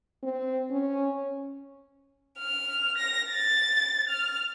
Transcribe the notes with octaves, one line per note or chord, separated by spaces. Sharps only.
C4
C#4
F6
A#6
A6
F6